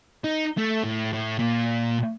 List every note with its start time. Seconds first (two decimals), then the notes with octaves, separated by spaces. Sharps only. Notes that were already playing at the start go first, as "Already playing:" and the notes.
0.24 D#4
0.58 A3
0.84 A2
1.13 A2
1.39 A#2